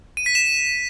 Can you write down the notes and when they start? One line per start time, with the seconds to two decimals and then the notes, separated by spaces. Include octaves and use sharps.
0.17 D#7
0.26 B6
0.35 E7